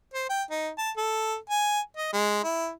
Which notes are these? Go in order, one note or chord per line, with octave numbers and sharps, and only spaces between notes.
C5
G5
D#4
A5
A4
G#5
D#5
G#3
E4